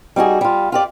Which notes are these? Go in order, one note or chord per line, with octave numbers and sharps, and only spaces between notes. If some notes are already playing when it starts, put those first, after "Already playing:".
G3 D#4 F#4 G#4
G3 F4
F4 G4 D5